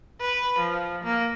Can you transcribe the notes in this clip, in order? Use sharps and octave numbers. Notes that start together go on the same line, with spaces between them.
B4
F3
A#3